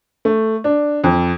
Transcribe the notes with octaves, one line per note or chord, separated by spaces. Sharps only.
A3
D4
F2